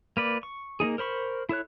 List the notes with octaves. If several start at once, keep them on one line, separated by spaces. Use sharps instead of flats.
A#3 B4 D5
C#6
A#3 C4 D#4 G#4
A#4 C5 B5 C#6
E4 A4 C#5 F#6